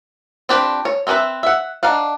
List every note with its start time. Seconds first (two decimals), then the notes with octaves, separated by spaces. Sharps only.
0.49 C4 D4 F4 G4 B4
0.85 C#5
1.07 C4 C#4 D#4 B4 E5
1.43 E5 F#5
1.83 D4 D#4 F5 F#5